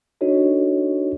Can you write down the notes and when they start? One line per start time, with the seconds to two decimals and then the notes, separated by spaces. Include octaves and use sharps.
0.21 D4 D#4 F#4 A4 C#5 D#5